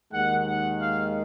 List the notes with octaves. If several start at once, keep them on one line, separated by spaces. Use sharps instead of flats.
D#2 D#3 G#3 F#5
F#5
F5